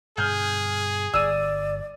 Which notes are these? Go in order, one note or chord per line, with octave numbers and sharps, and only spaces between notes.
G2 B2 D3 G#4 F6 G6
G1 G2 D5 E6 D#7